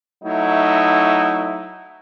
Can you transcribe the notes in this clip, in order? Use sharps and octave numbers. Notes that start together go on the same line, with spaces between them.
F#3 A3 D#4 E4